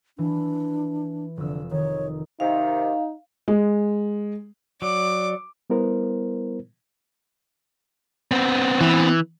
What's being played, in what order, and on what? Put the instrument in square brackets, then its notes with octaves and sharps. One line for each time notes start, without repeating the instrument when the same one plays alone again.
[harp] E3 [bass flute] D4
[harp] F1 E6 [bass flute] D3
[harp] D#3 [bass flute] C#5
[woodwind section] C3 D#3 [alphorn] D#4 [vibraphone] F5
[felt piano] G#3
[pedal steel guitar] F#3 [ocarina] D5 [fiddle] D6
[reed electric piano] G3 B3 E4 A#4 C5
[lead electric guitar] B3 C4
[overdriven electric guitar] E3